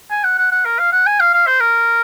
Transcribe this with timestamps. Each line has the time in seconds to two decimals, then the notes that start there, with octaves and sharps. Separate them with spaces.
0.11 G#5
0.24 F#5
0.38 F#5
0.52 F#5
0.65 A#4
0.79 F5
0.93 F#5
1.06 G#5
1.20 F5
1.34 F5
1.47 C5
1.60 A#4